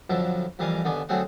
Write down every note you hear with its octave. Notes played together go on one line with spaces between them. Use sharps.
F2 D3 F3 F#3 E4
F2 E3 G3 A#4 F5 G#5
D#2 D3 B3 D5 G#5
D3 F#3 A3 C4 G#4 F#5